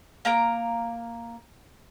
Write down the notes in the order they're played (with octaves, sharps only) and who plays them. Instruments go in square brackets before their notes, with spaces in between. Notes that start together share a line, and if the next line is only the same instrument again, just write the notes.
[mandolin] A#3 A#5 D6